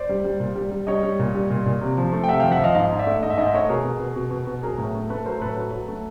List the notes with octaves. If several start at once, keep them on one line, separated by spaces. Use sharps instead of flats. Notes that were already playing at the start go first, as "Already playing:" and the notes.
Already playing: C5 D5
G3
G3
A#2
G3
G3
G3 C#5 D#5
G3
A#2
G3
A#2
A#2
C3
F3
A3
G5
C3 E5 F#5
F5 G5
F3
E5 F#5
F3 D#5 F5
G#2 D#5 F5
G#2
D5 E5
A3
G#2 D#5
E5
G#2 D#5
E5
A3 C#5 D#5
B2 G#4 A#4
B2
B2
B2
B2
B2
F#3 G#4 A#4
A2
A3
A3 A4 B4
F#3 A#4 C5
A2 A4 B4
F#3
F#3
A3